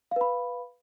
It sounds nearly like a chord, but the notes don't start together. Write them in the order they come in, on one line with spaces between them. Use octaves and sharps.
F5 B4 B5